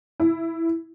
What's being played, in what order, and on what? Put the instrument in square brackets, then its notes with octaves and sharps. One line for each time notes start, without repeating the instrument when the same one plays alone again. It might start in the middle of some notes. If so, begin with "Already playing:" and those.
[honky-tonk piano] E4